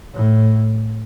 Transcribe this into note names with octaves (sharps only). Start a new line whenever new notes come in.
A2